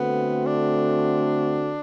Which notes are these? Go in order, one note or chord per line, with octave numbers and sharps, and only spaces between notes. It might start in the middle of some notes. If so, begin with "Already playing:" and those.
Already playing: D3 A3 B3 C4 F#4
D4